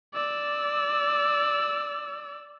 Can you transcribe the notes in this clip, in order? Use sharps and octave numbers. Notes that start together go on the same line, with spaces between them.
D5 E6